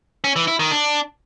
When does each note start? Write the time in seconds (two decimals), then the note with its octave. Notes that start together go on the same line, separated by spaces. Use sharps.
0.24 C#4
0.36 E3
0.48 E4
0.59 D#3
0.71 D4